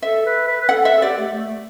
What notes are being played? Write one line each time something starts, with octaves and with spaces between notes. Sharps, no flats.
A4 E5
B4
B4
B4
A4 F#5
E5
A4
G4 D5
A3
A3